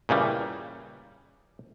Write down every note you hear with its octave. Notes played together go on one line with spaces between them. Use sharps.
A#2 C#3 E3 G3